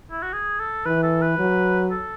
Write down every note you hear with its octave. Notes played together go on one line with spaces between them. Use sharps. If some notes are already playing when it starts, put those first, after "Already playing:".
E4
F#4
G#4
A4
E3 B4
A4
B4
F#3
A4